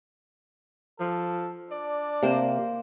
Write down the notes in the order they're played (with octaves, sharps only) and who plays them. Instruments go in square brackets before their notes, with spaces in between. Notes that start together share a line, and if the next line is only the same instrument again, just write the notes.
[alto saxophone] F3 [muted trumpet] A4
[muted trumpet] D4 [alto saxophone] D5
[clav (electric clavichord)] C3 [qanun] A#3 C5